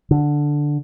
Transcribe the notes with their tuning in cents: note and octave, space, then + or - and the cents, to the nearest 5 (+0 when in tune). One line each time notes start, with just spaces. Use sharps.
D3 +0